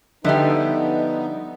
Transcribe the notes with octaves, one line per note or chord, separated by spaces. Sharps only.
D3 F3 G3 B3 D#4 E4 D#5